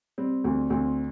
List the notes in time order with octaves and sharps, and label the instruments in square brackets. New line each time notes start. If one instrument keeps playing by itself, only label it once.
[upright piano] G3 C4
D2 C4
D2 C4